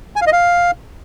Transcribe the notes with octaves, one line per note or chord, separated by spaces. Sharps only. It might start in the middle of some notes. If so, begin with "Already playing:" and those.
G#5
F5
D#5
F5